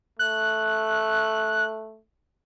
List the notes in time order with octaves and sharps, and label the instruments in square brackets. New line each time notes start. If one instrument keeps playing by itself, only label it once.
[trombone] A3 [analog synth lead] F#6